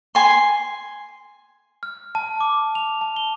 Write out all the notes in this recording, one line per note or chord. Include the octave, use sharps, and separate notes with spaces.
G#5 C6
F6
A5
D6
F7
A5
G7